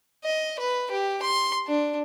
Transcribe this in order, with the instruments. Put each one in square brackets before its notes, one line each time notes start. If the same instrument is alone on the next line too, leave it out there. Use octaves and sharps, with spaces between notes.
[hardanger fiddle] D#5
B4
G4
C6
D4